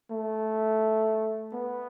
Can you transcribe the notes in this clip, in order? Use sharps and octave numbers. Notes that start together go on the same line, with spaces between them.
A3
B3